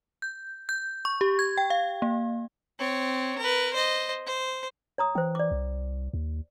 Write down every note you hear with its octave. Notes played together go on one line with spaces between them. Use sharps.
G6
G6
C#6
G4
G#6
G5
F5
A#3
C4 C#5
A#4 B4
C5 D#5
C5
C#5 A#5 D#6
E3 C5 G5
D5 D6
C2
D#2